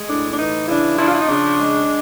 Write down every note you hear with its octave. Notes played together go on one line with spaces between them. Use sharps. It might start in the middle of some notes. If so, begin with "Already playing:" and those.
Already playing: G#3
A2 D4
D4
E3 D#4
C#3 D4 E4
F3 D4 E4
F4
E4
D#4
C#3 D4
G#3